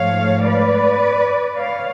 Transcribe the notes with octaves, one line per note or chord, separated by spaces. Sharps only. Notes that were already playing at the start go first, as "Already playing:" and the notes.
Already playing: G#2 F3 A3 C#5 F5
B4 D5
C#5 F5